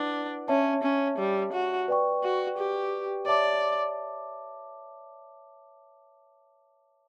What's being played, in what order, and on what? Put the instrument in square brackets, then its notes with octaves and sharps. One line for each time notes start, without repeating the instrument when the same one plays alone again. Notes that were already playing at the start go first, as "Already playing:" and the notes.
Already playing: [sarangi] D4 [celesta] E4 B4 F#5
[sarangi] C#4 [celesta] C#5 E5 A5
[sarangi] C#4
G3
F#4
[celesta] B4 D5 G5 C#6
[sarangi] F#4
G4
[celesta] C#5 E5 A5 D6 [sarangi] D5